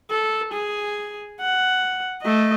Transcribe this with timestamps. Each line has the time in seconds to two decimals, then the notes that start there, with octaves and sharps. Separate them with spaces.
0.10 A4
0.53 G#4
1.40 F#5
2.22 A3 D#5